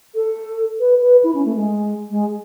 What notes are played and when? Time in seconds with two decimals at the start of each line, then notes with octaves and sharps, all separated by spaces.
0.15 A4
0.80 B4
1.01 B4
1.24 E4
1.34 C#4
1.45 A3
1.56 G#3
2.10 G#3